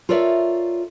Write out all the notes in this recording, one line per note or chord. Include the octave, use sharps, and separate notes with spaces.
F4 A4 A#4 C#5 D5 E5